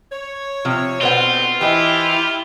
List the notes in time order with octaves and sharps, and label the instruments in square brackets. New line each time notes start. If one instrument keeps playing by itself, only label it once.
[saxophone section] C#5
[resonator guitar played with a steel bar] C3 F3
[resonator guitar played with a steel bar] B2 B4 F#5 [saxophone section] D3 B3 C4 [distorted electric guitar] F4
[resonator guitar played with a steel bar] E3 C5 D#5 [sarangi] E4 [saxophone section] G4